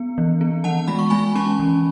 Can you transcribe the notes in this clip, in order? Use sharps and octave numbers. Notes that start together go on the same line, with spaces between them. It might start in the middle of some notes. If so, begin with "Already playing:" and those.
Already playing: B3
E3
B3
E3 F#5 A5
G#3 B5
C#6
G#3 G#5 B5
C#4 A5 C#6
E3